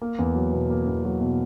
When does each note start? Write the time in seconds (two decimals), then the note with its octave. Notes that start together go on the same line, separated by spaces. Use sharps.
0.01 A#3
0.19 E2
0.35 F#3
0.53 B2
0.70 A#3
0.88 E2
1.04 F#3
1.21 B2